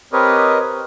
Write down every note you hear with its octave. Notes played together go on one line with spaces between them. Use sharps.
C4 G4 A#4 B4 C#5 D#5